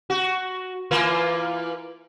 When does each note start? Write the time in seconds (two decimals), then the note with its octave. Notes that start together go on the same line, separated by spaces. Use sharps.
0.10 F#4
0.91 E3 A#3 F4